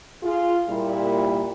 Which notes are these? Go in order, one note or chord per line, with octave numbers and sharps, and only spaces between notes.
F4 G#4
A#2 G3 E4